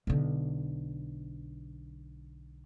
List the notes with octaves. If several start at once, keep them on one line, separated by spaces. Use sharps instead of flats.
B1 D3